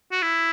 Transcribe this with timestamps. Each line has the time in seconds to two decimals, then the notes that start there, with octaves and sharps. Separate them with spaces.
0.11 F#4
0.22 E4